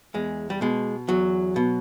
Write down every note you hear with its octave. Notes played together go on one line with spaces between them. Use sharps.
E2 G#3
G3
B2 G#3
E2 F#3
B2